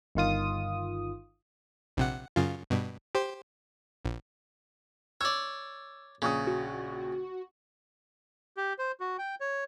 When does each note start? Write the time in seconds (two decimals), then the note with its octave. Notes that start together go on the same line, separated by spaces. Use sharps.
0.15 G1 D#3 F4 D#6
1.97 A#1 C3 F#5
2.36 F#2 C#3 F4
2.70 G2 B2
3.15 G4 C5
4.05 A#1
5.21 C#5 D5 E6
6.22 A#1 C#3 C#6 D#6
6.47 F#4
8.57 G4
8.79 C5
9.00 F#4
9.18 G5
9.41 C#5